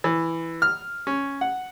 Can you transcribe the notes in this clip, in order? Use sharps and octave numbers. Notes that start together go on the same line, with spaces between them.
E3
F6
C#4
F#5